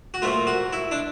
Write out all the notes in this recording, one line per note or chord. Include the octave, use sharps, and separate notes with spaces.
F#4
A#2 F3 A3 F4
F#4
E4
D4